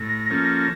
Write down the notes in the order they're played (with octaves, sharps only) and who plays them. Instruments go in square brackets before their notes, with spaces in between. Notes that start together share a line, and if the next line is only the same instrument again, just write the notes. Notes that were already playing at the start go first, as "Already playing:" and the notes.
Already playing: [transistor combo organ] A2 [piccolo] A#6
[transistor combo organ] F3 A#3 C#4 A4